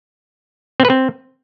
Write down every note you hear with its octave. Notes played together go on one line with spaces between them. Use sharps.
C4
B4
C4